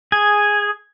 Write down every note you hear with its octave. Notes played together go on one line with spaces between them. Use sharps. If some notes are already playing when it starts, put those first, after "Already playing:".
G#4 G#6